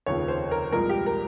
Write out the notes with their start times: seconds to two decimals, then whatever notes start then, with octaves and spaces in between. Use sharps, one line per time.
0.06 F1 D#2 C#3 F3 C#5
0.28 C5
0.51 A#4
0.72 C2 A#2 F3 G#3 A#4
0.89 G4
1.06 A#4